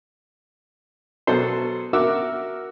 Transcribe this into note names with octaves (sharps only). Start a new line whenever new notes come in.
B2 F#3 A4 C5
F#4 A#4 E5 D6 E6